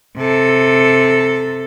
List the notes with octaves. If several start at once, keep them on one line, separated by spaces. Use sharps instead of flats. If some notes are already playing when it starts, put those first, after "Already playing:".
C3 A4